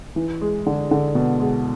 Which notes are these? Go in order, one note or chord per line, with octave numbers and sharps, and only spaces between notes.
E3
G#3
D3
D3
B2
G#3